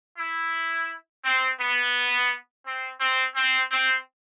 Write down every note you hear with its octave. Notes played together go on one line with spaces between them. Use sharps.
E4
C4
B3
C4
C4
C4
C4